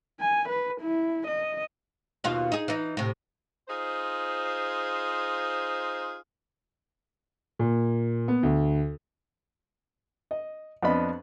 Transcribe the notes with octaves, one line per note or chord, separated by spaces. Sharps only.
G#5
B4
E4
D#5
D#2 B2 F4
D#4 G#4
E3 D#4
A2 C3
D#4 F4 G#4 C5
A#2
B3
D2
D#5
F2 B3 D4 D#5 B5